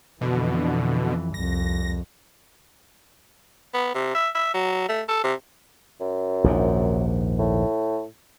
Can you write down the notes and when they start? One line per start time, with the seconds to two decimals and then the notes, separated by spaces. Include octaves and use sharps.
0.21 F2 B2 D3 E3
1.34 C2 F2 A#6
3.74 B3
3.94 C3
4.15 E5
4.35 E5
4.54 F#3
4.88 A3
5.08 A4
5.23 C3
6.00 F#2
6.44 A#1 D#2 G#2
7.39 A2